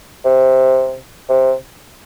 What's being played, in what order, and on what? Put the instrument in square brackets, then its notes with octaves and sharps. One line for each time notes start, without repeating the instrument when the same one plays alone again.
[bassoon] C3
C3